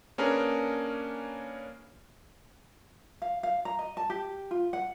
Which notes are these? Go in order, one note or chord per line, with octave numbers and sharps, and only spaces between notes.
A#3 C#4 D4 G#4 A#4 B4
F5
F5
A#5
D#5
A5
G4
F4
F#5